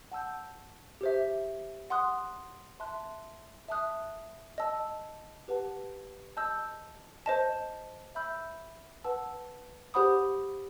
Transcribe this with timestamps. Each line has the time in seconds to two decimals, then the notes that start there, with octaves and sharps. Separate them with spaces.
0.11 F#5 A5 E6 G6
1.01 G4 C5 E5
1.90 F#5 C6 D#6 F#6
2.80 E5 A5 C6 F#6
3.68 E5 A5 D#6 F#6
4.58 D#5 A5 E6
5.48 G4 B4 F#5 A5
6.37 D#5 A5 E6 G6
7.26 C5 D#5 A5
8.15 E5 B5 E6 G6
9.04 B4 F#5 A5 E6
9.94 G4 C5 F#5 B5 D#6